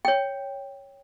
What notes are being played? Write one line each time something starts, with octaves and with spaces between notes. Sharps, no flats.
C#5 G5